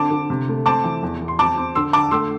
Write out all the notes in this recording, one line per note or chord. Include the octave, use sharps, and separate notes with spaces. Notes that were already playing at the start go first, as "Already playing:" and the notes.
Already playing: D3 C4 A5 D6
D3
C3
A3
C4 A5 D6
E3
E2
E2
C6
C4 A5 D6
C4
D3 C6 E6
D3 A5 D6
A3 C6 E6